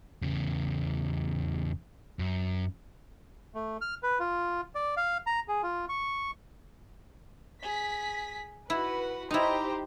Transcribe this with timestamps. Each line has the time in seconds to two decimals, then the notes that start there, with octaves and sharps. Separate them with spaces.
0.22 E2 C#3
2.19 F#2
3.54 A3
3.81 F6
4.03 B4
4.19 F4
4.75 D5
4.97 F5
5.27 A#5
5.48 G#4
5.63 F4
5.89 C#6
7.62 G#4 B6
8.70 E4 F#4 B4 F#5
9.31 D#4 E4 G4 C5 A#5